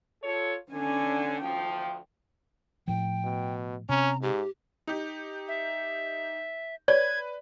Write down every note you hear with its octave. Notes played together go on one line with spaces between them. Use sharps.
F4 A4 C#5
D3 C#4 G#5
D2 F3 G5
A2 F3 G5
B2
C3 C#4 A#5
G#2 G4
D#4 G4
E5
B4 C#5 D5 G#6